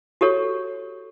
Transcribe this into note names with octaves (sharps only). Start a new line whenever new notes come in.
F#4 G4 A4 C#5